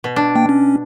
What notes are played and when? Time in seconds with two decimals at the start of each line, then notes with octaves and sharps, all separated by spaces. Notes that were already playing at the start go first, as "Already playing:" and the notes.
0.04 B2
0.16 D4
0.35 A#3 G5
0.49 C#4